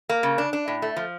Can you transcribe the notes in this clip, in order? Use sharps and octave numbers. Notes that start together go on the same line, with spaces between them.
A#3
C#3
D4
D4
A2
A3
F3